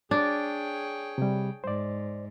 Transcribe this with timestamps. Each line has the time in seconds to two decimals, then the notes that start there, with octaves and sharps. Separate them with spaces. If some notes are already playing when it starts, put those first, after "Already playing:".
0.11 D4 G#4 C#5 G5
1.18 C3 G3
1.64 G#2 C5 D5